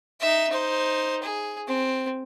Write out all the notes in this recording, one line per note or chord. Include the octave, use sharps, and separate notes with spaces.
D#4 E5
D#4 C5
G#4
C4